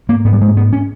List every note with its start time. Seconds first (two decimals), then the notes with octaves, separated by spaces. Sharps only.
0.09 G#2 A#3
0.24 G#2 B3
0.33 G3
0.41 G#2 G#3
0.48 A#3
0.56 G#2 B3
0.73 C#4